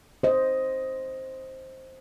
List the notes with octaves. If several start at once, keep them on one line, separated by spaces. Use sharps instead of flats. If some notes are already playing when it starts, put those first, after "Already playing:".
C5 D#5